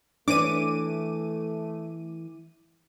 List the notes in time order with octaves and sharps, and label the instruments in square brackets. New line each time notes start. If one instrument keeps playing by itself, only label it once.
[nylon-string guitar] E3 B4 C#5 [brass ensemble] A3 [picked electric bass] D4 [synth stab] D6 D#7